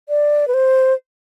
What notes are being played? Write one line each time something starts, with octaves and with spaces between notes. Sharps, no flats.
D5
B4
C5